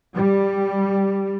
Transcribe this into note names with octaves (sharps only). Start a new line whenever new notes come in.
G3